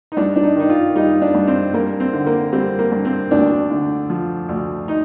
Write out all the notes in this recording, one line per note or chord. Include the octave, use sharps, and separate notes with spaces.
D#4
G2 D4
D4
D#4
D#3 D#4
F4
G3 D#4
D4
G2
C4
G2 A#3
C4
D3
A#3
G3 C4
A#3
G2
C4
D2 D4
D3
F3
D2
D#4